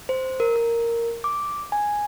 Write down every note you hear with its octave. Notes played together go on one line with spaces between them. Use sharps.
C5
A#4
A#4
D6
G#5